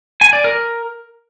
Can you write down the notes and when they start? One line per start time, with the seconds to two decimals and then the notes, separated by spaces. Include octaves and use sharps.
0.21 G#5
0.33 D5
0.44 A#4